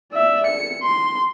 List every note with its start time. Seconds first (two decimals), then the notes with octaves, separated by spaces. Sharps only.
0.13 D5 E5
0.46 C#7
0.83 C6